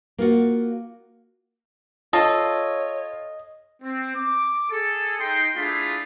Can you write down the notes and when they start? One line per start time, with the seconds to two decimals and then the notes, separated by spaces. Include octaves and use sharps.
0.18 A#3 F4 F#4
2.13 F4 A4 C#5 D#5
3.83 C4
4.16 D6
4.71 G#4 A4
5.20 D#4 G5 C6
5.56 A3 D4 E4 F4 G#4 B5